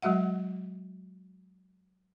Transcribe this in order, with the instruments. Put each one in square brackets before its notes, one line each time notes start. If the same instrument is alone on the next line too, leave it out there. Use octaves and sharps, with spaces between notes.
[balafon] F#3 G#3 F#4 E5 F#5